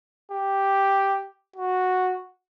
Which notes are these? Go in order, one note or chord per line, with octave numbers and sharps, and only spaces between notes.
G4
F#4